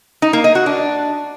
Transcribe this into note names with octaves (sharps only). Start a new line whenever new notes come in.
D#4
A#3
D#5
F#4
D4